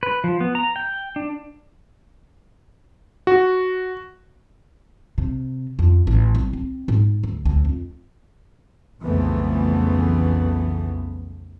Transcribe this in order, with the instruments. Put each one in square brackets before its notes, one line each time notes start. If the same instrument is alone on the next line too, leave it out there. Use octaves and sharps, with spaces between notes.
[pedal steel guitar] B4
F3
B3
A#5
G5
D4
[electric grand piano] F#4
[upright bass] C3
F2
A1
C2
C4
G#2
D2
D2
F2
[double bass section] B1 F2 C#3 E3 A3 B3